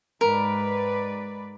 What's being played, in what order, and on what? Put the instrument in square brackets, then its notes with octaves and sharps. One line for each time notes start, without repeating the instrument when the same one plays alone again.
[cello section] G#2 B4 D5 [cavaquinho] A#4